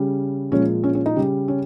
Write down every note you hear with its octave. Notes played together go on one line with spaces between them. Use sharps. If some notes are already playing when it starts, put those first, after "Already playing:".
Already playing: C#3 G3
A#2 F3 G#3 C#4
C#4
C#4
D#4
C#3 G3
C#4